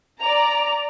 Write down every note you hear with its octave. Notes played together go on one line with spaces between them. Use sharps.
D5 A#5 F7